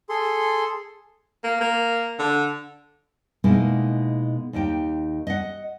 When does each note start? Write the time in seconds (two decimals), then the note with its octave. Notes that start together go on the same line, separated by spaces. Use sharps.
0.09 G#4 A4 C6
1.43 A#3
1.61 A#3
2.19 D3
3.44 B2 G#3 A#3 D#4 E4
4.53 D#2 D#3 G4 G5
5.27 D#5 F#5